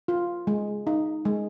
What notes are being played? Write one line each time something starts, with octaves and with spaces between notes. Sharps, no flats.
F4
G#3
D#4
G#3